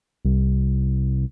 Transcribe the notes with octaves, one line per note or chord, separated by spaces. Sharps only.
C2